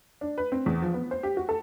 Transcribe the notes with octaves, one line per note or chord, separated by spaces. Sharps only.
D4
B4
C4
E2
F3
B3
C5
G4
F#4
A4